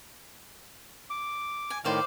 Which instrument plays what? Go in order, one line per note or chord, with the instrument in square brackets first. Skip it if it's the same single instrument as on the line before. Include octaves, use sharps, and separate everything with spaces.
[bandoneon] D6
[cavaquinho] G#5
[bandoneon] A2 D#3 [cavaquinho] C5 D5 F5